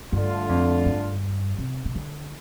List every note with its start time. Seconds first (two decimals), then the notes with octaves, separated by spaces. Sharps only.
0.12 G2 D3 A3 D4 F4
0.49 F2
0.86 G2
1.58 C3
1.85 C3
1.95 D3